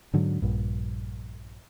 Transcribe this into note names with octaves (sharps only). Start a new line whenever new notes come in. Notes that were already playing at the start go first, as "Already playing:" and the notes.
G#2 D3 F#3
A#1 G2